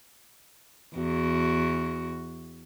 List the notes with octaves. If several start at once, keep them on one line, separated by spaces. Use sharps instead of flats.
E2 F#4